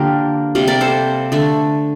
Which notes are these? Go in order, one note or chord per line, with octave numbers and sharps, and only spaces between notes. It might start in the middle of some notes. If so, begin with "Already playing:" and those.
Already playing: D3 F3 A#3 G4 A#4
C3 G3 A#3
A#4 D5
A4 C5
D3 A3